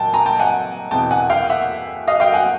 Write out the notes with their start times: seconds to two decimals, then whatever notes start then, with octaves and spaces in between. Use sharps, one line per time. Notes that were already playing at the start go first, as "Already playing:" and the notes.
Already playing: A#2 F#3 G5 A5
0.13 G#5 A#5
0.26 G5 A5
0.39 F#5 G#5
0.91 E2 B2 G#3 C4 G5 A5
1.11 F#5 G#5
1.30 F5 G5
1.49 E5 F#5
2.07 D#5 F5
2.20 F5 G5
2.34 F#5 G#5